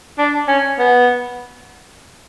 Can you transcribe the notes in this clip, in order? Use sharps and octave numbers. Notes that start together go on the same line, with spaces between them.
D4
C#4
B3